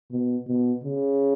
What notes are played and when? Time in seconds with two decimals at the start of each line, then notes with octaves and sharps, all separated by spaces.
0.11 B2
0.48 B2
0.84 C#3